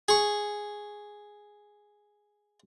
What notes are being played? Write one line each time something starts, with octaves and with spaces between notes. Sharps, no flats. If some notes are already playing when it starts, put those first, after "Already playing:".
G#4 C#6